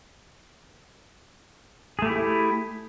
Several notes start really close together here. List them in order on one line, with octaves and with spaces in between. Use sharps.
G#4 A3 G4 E4